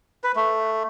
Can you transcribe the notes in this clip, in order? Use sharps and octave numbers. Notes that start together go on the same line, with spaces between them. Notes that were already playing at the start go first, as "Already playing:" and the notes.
B4
A3